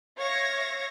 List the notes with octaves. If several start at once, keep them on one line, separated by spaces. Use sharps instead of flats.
C#5 E5 F5 C#6 G#6 A#6